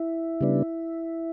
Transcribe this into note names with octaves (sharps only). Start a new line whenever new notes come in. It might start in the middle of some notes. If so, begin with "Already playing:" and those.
Already playing: E4
C#3 G3 B3 D4